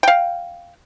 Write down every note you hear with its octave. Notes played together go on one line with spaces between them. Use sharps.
F5 G5